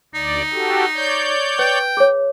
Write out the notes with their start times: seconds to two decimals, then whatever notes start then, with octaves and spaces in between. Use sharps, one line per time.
0.15 D2 D#4 D5
0.53 F#4 G4 A4
0.95 C#5 D5 G6
1.59 B4 G5
1.97 G#4 C#5